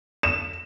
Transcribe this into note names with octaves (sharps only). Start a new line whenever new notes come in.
E7